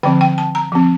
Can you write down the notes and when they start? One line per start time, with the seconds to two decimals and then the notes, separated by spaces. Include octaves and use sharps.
0.03 D3 F3 C4 G5
0.21 G5
0.38 A5
0.55 A#5
0.72 F3 C4